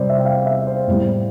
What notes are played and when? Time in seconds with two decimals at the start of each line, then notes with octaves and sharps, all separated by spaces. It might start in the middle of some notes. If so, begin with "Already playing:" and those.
Already playing: C3 G3 C5 D5
0.10 E5
0.19 G5
0.25 F5
0.46 E5
0.67 C5
0.88 A2 G3